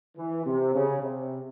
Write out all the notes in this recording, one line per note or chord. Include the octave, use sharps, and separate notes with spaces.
E3
C3
C#3
C3